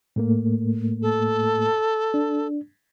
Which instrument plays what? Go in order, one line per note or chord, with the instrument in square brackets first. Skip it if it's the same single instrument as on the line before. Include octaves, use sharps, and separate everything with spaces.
[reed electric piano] A2 A3 A#3
[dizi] A4
[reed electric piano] D4